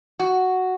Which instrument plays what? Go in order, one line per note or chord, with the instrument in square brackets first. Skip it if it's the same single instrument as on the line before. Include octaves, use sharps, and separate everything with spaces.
[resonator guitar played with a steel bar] F#4